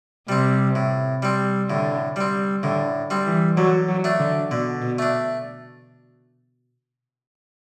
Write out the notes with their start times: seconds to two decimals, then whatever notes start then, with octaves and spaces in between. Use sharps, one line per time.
0.29 C3 G3 C4
0.75 A2
1.22 G3 C4
1.70 A2 D3
2.16 G3 C4
2.63 A2 D3
3.10 G3 C4
3.26 E3
3.57 D3 F#3
3.88 F#3
4.04 A3 D4
4.20 D3
4.51 B2 D3
4.82 B2
4.99 A3 D4